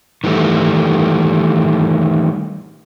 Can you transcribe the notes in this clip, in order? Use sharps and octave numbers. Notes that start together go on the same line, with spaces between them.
D#3 E3 G3 A3